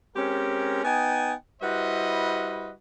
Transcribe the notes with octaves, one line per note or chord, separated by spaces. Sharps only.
G#3 C4 C#4 G4 A#4
B3 D#4 G5 G#5
G3 E4 F#4 B4 C5 D#5